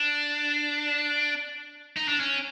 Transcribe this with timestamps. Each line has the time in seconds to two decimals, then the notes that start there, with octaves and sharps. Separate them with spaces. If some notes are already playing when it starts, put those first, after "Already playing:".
Already playing: D4
1.97 D#4
2.08 D4
2.20 C#4